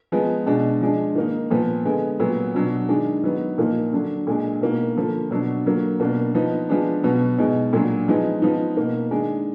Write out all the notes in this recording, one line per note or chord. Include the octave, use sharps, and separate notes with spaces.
F3 G#3 B3
B2 G#3 D4
F3 G#3 D4
D#3 A#3 D#4
A#2 F3 B3
D3 G#3 B3
A#2 F#3 B3
B2 F#3 D4
D#3 G#3 D4
D#3 F#3 B3
A#2 F3 A#3 D#4
D3 F#3 D4
A#2 G#3 D4
B2 A#3 D#4
D3 F3 A#3
B2 F#3 D4
D3 F#3 A#3
B2 A#3 D4
F3 B3 D#4
F3 G#3 B3 D4
B2 F#3 B3
B2 G#3 D#4
A#2 F#3 D4
F3 G#3 B3 D#4
F3 B3 D#4
B2 A#3 D#4
D#3 G#3 D4